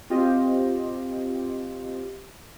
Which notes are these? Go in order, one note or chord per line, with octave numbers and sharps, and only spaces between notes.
C4 F4 G4 C5 D#5